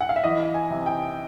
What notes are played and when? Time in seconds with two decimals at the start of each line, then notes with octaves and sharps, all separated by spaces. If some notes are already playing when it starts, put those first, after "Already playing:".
0.01 F#5
0.09 F5
0.16 E5
0.24 E3 D#5
0.54 G#5
0.71 C3
0.86 G5